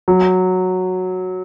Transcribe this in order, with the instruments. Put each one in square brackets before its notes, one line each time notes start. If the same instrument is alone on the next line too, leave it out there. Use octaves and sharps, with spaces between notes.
[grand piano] F#3